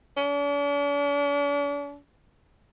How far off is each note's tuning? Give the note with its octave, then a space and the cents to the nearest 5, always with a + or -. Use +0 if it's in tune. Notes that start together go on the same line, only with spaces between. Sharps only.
D4 -45